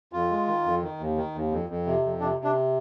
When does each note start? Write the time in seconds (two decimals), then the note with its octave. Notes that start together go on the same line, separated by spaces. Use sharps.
0.13 F2 F4
0.31 G#3
0.48 D#3
0.65 F2
0.83 D#3
0.99 D#2
1.17 D#3
1.35 D#2
1.51 F2
1.69 F2
1.86 C3
2.04 F2
2.21 C3 D4
2.38 C3
2.44 D4